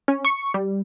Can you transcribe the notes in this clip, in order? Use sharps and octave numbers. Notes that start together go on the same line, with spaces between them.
C#4
C#6
G3